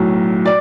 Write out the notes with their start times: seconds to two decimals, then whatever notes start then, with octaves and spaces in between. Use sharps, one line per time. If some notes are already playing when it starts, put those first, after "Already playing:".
Already playing: B1 A2 F#3
0.45 D5